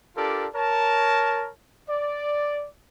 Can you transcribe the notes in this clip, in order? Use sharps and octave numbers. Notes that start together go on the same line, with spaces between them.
D4 F4 G4 A4 A#4 D5
A#4 C#5 A5
D5